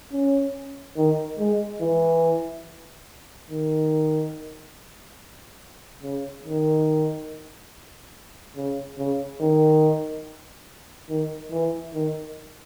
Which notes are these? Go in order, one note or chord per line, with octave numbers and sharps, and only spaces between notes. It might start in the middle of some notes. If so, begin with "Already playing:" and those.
C#4
D#3
G#3
E3
D#3
C#3
D#3
C#3
C#3
D#3
D#3
E3
D#3